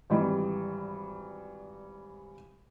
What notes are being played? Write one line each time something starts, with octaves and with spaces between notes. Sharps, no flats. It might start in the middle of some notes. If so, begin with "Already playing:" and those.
G#1 E3 G3